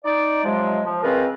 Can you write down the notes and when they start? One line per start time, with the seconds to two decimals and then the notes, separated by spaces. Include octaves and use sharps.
0.04 D#4 D5
0.45 C3 F3 F#3 G#3
0.85 F3
1.03 C#3 G#3 C4 F4 A#4 B4